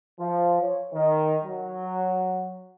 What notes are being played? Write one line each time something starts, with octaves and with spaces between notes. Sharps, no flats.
F3
C#5
D#3
F#3